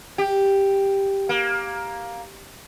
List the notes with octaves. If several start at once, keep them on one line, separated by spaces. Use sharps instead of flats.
G4
A#3